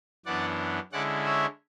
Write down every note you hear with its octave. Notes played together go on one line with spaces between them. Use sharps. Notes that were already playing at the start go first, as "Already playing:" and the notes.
F#2 E3 B3 D4 D5 F#5
D3 G#3 C#4 E4 D5 F#5
C#5 E5